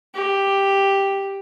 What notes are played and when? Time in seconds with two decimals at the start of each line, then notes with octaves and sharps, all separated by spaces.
0.15 G4